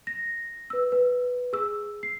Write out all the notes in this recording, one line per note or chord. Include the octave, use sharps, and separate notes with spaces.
A#6
B4 E6
B4
G#4 E6
C7